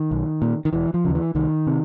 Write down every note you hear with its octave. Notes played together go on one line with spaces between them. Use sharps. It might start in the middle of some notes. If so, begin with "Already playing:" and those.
Already playing: D#3
B1
A#2
D#3
E1 E3
F3
D#2 C#3
E3
C2 D#3
C3